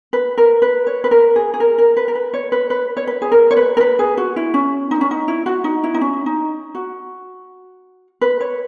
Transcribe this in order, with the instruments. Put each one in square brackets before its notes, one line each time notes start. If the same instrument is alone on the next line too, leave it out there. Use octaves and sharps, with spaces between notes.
[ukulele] B4
A#4
B4
C#5
B4
A#4
G#4
G#4
A#4
A#4
B4
A#4
B4
C#5
B4
B4
C#5
B4
G#4
A#4
C#5
B4
A#4
B4
G#4
F#4
E4
C#4
D#4
C#4
D#4
E4
F#4
D#4
E4
D#4
C#4
D#4
F#4
B4
C#5